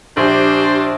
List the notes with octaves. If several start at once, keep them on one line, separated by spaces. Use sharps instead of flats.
A#1 D4 G4 C5